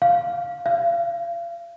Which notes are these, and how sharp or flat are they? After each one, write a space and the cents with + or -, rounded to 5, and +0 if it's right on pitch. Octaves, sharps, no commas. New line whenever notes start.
F5 -5
F5 -35